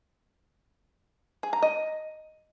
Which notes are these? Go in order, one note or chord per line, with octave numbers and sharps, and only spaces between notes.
G#4
A#5
D#5